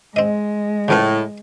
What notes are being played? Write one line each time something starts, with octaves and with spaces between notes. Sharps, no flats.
G#3 C4 D#5
A2 C#3 F3 B3